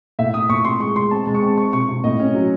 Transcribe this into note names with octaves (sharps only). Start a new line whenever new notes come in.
A2 E5
A2 D#6
A2 C#6
C3 C6
G#3 C#6
G#3 C6
C4 A5
G#3
C#6
C4
C4 C#6
C3 C#6
C3
A2 D#5
C#4
F#3